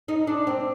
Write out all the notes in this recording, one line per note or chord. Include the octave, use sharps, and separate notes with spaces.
D#4
D4
C4